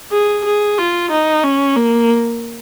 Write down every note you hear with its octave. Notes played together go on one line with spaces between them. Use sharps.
G#4
G#4
F4
D#4
C#4
A#3